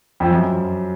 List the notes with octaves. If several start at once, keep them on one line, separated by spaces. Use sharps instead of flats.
F2
F#2